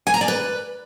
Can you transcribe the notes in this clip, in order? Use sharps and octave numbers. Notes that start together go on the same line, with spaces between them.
G#5
A#5
D5
B4